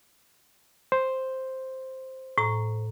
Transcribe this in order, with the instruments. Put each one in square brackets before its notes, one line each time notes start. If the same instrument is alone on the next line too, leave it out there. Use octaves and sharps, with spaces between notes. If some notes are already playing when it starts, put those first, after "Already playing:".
[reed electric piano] C5
[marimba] A2 A#5